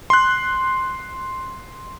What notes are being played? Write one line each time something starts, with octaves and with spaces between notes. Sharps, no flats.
C6 F#6